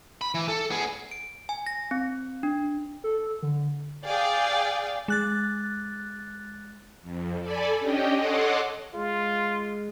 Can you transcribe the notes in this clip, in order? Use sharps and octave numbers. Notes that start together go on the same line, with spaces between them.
B5
E3
A4
B3 G#4
D7
G#5
A#6
C4
D4
A4
D3
G#4 D5 F5 G5
G#3 F#6 A6
F2
A4 D5 G#5 B5
C#4 D4 G4 D#5 G5
A4 C#5 D#5 F#5 C6 D6
G#3 F4